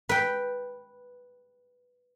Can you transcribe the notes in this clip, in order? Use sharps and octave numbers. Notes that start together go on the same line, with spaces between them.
B4 G5